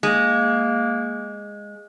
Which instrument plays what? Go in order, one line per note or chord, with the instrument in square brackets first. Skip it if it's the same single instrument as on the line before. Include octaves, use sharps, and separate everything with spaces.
[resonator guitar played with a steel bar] G#3 [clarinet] A#3